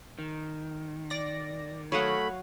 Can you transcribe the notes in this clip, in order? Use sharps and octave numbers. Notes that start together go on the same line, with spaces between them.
D#3
D5 A#6
F#3 A3 C#5 D#5 F5 F#5 B5